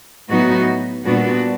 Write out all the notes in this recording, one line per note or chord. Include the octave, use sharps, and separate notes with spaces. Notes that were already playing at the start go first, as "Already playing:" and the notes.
A2 F#3 B3 D#4 F#4
A#2 G3 B3 D4 F#4